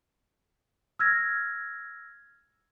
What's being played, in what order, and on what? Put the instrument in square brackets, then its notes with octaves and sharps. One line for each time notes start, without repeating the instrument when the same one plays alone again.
[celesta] E6 F6 G#6 A#6